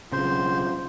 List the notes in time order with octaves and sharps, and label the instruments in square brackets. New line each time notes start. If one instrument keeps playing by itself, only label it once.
[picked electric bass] B1 C#3 [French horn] F4 [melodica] C5